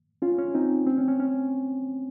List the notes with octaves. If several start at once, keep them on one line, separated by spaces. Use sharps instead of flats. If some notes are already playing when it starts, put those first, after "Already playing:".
C#4 F4
C#4
C4 D#4
C4
C#4
C#4
C#4